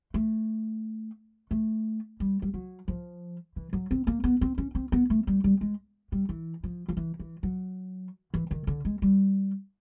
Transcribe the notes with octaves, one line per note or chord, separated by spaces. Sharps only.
A3
A3
G3
G3
F#3
F3
E3
F#3
C4
A#3
B3
C4
C#4
C4
B3
A3
G3
G3
G#3
G3
E3
F3
F3
E3
E3
F#3
E3
D#3
D3
G#3
G3